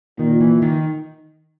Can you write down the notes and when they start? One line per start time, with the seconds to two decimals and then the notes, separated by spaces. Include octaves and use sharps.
0.19 A#2 D#3
0.40 E3
0.62 D#3